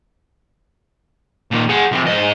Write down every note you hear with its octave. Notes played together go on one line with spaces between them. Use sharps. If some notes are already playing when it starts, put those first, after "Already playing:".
A#2 D#3
G#4 F#5
C3 F3
G#2 D#5